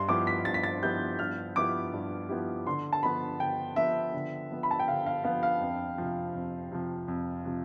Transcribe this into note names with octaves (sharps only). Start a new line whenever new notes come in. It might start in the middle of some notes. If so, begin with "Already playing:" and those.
Already playing: G2 C6
F3 B3 E4 G4 D6
B6
G2 A6
B6
A6
F3 B3 E4 G4 G6
G2 F6
F3 B3 E4 G4 D6
G2
F3 B3 E4 G4
D3 C6
A5
F3 B3 B5
D3 G5
F3 B3 E5
D3
F3 B3
B5
A5
G5
D3 F5
F5
F3 B3 F5
F5
F2
C3 F3
F2
C3 F3
F2
C3 F3